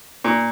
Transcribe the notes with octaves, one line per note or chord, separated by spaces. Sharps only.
A#2